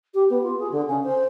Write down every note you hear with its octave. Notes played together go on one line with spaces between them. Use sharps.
G4
B3
F4
G#4
D3
C#3
C5